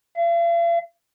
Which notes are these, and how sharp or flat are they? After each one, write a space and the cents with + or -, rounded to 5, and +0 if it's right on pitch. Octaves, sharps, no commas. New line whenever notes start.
F5 -45